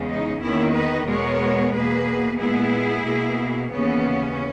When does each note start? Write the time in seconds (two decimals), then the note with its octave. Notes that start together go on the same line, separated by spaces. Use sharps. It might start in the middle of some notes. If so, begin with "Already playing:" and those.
Already playing: E2 C#3 G#3
0.09 D#4
0.41 E2 D#3 A#3 C#4 E4
0.75 B4 D#5
1.07 E2 B2 G#3 B3 A#4 C#5
1.72 E2 B2 A#3 G#4 B4
2.39 A#2 G#3 B3 E4 G#4
3.04 B2 A#3
3.71 D#2 C#3 E3 B3 C#4